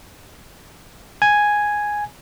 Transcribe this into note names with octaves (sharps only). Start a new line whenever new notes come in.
G#5